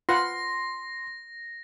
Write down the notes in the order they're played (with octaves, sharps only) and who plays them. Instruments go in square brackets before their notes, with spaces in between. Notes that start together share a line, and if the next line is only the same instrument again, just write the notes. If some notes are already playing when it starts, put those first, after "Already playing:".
[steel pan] F4 B4 F#5 [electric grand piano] C6 [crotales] A#6